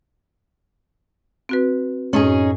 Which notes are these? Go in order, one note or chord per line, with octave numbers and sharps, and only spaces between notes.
C4 F#4 B4
F#2 A2 C#4 D#4 G#4 D#6